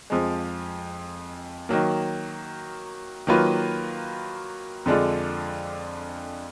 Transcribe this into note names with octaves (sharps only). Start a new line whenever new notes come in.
F2 F3 G#3
D#3 F#3 A#3
D#3 F#3 A#3 F4 B4
F2 D3 G#3 D4 F4